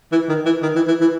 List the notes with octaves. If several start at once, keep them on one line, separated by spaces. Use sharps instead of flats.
E3
D#3
E3
D#3
E3
E3
E3